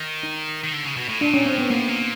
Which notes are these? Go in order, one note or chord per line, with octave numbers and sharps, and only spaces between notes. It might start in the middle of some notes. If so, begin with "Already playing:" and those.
Already playing: D#3
D#4
D#3
D3
C#3
B2
A2
A#2 D4
C#4
A2 C4
B3
A#2 A#3
A2
A#2